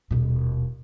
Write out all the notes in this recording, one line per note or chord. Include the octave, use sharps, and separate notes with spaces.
D#1 B2